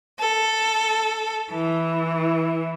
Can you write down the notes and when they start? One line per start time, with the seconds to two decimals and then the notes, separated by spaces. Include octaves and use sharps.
0.19 A4
1.51 E3